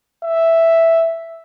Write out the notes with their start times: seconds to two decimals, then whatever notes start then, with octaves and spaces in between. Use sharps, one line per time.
0.24 E5